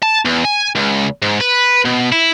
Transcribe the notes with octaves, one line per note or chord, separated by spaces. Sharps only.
A5
E2
G#5
C#2
G#2
B4
B2
E4